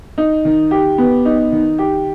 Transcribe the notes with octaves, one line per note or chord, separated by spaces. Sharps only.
D#4
D#3
G4
B3
D#4
D#3
G4